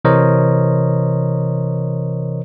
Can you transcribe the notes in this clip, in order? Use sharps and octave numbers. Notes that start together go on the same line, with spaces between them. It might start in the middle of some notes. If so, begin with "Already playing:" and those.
C3 E3 A#4 C5 C#5 D#5